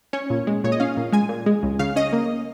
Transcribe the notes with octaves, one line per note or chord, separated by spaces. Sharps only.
C#4 C#5
A#2
G#3
A#2 C#5
D#5
C#4 F5
A#2
G#3 G#5
A#2
G#3
C#2
C#3 F5
C#4 D#5
A#3